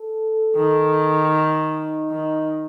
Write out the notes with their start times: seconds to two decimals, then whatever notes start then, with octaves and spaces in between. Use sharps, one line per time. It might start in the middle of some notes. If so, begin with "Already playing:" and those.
Already playing: A4
0.56 D#3
1.33 D#4
2.10 D#3